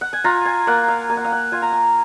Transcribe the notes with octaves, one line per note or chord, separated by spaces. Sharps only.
F#5
G#5
F4 A#5
G#5
A#3 F#5
F5
A#3 G#5
F#5
F5
F#5
F4 G#5
A#5
G#5